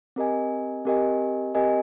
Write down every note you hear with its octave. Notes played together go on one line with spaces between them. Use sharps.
C4 G4 A#4 D#5 G#5
C4 G4 A#4 D#5 G#5
C4 G4 A#4 D#5 G#5